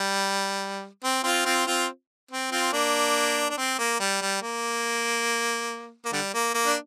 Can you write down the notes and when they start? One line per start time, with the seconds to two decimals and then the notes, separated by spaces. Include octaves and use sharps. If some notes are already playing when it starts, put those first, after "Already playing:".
Already playing: G3
1.04 C4
1.24 C4 F4
1.46 C4 F4
1.66 C4 F4
2.31 C4
2.51 C4 F4
2.72 A#3 D4
3.50 D4
3.58 C4
3.78 A#3
4.00 G3
4.22 G3
4.42 A#3
6.05 A#3
6.13 D3 G3
6.34 A#3
6.54 A#3
6.66 D4